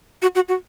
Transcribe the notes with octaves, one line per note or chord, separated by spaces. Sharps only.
F#4
F#4
F#4